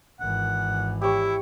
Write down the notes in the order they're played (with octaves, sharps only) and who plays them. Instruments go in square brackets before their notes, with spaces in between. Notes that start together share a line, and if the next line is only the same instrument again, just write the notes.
[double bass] G#1 E3 [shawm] F#5
[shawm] E4 [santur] G4 C#5